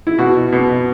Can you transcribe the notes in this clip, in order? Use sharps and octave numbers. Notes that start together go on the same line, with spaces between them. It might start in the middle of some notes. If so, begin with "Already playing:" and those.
E4
B2 F#4
B2